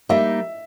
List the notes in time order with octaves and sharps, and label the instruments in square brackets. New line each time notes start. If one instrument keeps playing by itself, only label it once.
[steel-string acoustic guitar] G3 A#3 D#4 [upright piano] E5